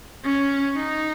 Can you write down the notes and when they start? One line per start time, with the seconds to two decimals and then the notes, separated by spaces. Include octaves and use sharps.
0.25 C#4
0.77 D#4